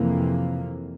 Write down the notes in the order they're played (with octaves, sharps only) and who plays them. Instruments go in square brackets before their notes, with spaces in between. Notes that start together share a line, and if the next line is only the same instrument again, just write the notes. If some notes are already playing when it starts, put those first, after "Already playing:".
Already playing: [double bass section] F2 C3 E3 A#3